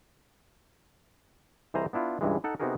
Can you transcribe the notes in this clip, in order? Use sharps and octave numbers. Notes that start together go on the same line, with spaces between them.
C2 E3 G#4 C5 D#5 A#5
B3 D4 E4 F4
C#2 G2 E3 G#3
D#4 A4 F#5
C3 B3 D#4 F#4 G#4 A#4